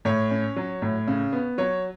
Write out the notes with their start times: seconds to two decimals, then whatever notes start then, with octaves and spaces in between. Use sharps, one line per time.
0.05 A2 C#5
0.31 C#4
0.56 F#3
0.82 A2
1.07 C#3
1.33 B3
1.58 F#3 C#5